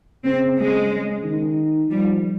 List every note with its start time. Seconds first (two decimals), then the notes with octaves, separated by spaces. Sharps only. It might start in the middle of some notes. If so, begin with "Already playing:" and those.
0.24 C#3 C4
0.58 G#3
1.24 D#3
1.90 F3 G3